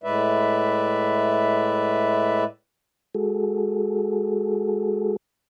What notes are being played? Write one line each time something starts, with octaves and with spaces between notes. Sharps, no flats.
A2 G#3 B4 D5 E5
G#3 F#4 G#4 A4